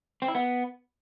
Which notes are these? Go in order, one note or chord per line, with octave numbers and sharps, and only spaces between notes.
C4
E4
B3